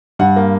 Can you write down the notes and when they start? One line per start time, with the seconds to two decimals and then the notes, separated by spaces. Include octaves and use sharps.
0.19 G2 F#5
0.36 A#3